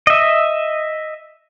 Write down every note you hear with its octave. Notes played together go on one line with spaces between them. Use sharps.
D#5 E5